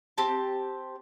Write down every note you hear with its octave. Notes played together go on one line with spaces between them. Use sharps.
C4 G4 A5